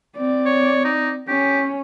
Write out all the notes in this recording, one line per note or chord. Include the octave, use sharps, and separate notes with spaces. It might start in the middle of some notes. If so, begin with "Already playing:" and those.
C4 D5
C#5
D#4
C#4 G4